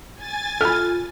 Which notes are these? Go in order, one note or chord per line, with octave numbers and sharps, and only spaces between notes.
G#5 A6
F4 A4 B5 F6